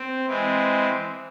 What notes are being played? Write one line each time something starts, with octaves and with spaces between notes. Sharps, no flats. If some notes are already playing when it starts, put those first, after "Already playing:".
Already playing: C4
E3 G#3 C4